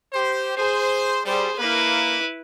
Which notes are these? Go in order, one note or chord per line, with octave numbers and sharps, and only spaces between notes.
G4 C5
G#4 C5
G3 G#4 C5
A#3 E4 B4